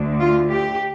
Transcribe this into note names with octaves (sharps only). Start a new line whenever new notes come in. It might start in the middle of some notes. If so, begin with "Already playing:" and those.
Already playing: D2 D3
F4
G4